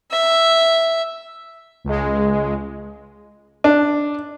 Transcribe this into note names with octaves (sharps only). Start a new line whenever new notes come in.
E5
C#2 G#3
D4